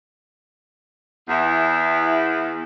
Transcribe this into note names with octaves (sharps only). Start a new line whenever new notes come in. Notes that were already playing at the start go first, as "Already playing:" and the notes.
E2 E4